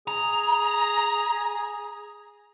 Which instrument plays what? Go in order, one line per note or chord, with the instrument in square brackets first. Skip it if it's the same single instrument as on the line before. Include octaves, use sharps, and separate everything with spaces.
[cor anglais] G#4 [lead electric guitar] A#5